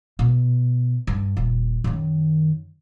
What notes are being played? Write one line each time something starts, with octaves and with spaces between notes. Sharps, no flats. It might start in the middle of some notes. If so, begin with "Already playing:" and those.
B2
G2
D#1
F#2 D#3